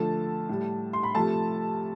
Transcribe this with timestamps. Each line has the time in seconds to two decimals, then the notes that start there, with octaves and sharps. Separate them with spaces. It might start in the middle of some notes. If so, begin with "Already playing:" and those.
Already playing: D3 F3 A3 A5
0.49 A2 G3
0.93 C6
1.03 B5
1.15 C3 F3 A3 A5